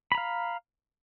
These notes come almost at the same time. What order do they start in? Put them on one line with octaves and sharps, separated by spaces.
B5 A#5 F5